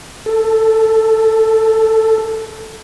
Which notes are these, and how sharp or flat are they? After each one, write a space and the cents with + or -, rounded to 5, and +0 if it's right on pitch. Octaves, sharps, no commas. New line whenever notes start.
A4 +10